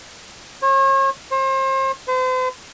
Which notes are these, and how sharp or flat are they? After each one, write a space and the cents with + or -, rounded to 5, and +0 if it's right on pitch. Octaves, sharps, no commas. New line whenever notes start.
C#5 -40
C5 +35
C5 -40